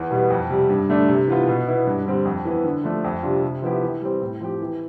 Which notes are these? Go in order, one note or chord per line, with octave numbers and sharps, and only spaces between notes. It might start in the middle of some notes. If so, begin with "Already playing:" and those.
Already playing: E2
B2 G3 B3
F2
C3 G3
G2
D3 A3 D4
C3
E3 B3 F4
B2
B3 E4
G2
D3 G3 C4
F2
E3 B3
D3
F3 A3 D4
F2
C3 G3 D4 F4
C3
F3 B3 E4 G4
E3
G3 C4
A2
F3 C4 G4
E3